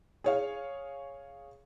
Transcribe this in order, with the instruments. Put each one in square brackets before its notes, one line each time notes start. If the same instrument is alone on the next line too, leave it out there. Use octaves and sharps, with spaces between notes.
[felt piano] G#4 C#5 F5